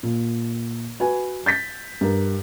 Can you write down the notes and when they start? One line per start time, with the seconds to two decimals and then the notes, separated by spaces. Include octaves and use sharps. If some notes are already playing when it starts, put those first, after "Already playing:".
0.03 A#2
1.00 F#4 B4 G#5
1.46 G6 A6 B6
2.01 G2 A#4